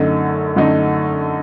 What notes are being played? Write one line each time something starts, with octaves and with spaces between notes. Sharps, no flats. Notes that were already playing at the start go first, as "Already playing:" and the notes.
Already playing: F#2 D3 A3 D#4
F#2 D3 A3 D#4